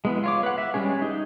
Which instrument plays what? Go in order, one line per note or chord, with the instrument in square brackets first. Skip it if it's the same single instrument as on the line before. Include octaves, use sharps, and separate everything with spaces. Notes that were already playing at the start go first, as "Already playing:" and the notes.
[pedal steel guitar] G#3 B3 E4
F4 C#5 D6
B4 F#5
E5
G3 G#3 C#4 G#4
D#4